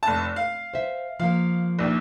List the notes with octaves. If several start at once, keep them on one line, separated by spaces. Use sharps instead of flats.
F1 A5
F5
C5 E5
F3 A#3 F5
A#1 D#2